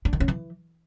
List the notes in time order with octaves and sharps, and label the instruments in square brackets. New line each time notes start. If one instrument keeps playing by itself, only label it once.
[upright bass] D4
D#3
C#4
E3